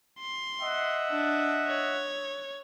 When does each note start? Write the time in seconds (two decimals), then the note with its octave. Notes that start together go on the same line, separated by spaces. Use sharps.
0.19 C6
0.61 D#5 E5 F#5
1.11 D4
1.68 C#5